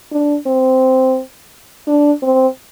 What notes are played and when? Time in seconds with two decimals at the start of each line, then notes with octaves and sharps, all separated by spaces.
0.12 D4
0.47 C4
1.88 D4
2.23 C4